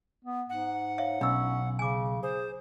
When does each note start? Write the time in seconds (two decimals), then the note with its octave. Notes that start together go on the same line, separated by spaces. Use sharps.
0.25 B3
0.50 G#2 F#5
0.98 C#5 E5 F5
1.21 B1 C#4 D4 E6
1.79 C#3 G#5 D6
2.23 G#4 C5